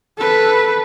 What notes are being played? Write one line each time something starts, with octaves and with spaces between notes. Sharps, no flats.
A4 B4